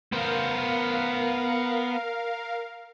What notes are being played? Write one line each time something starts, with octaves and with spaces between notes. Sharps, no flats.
B3 A#4 C5 F5